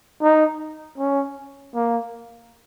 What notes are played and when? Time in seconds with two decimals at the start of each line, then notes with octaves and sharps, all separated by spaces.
0.22 D#4
0.98 C#4
1.75 A#3